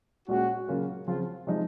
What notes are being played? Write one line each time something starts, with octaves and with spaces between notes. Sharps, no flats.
A#2 G#3 C#4 F#4
C#3 F#3 A#3 C#4 F4
C#3 F3 C4 F4
C3 F3 G#3 D#4